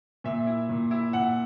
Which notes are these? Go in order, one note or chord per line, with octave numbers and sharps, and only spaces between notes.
A#2 E5
E4
A#2
E4
A#2 F#5